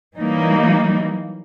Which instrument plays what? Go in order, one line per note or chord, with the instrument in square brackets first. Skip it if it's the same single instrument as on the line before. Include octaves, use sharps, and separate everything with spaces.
[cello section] E3 F#3 G3 A#3 D#4